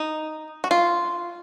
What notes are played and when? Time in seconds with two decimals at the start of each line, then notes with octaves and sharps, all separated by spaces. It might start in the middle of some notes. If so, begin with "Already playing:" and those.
Already playing: D#4
0.64 F#4
0.71 F4